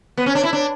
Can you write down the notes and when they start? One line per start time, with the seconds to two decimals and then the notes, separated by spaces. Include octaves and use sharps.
0.17 B3
0.26 C#4
0.35 D4
0.44 E4
0.53 D4